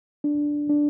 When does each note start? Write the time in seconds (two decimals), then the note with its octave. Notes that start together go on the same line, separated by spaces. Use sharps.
0.24 D4
0.69 D4